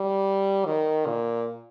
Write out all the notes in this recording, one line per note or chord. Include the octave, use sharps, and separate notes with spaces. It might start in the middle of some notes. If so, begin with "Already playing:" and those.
Already playing: G3
D#3
A#2